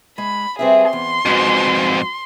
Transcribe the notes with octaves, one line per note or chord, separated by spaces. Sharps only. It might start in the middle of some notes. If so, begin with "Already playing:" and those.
G#3 B5
G3 C4 G#4 B4 E5
E2 C6
F2 G#2 F#4 B4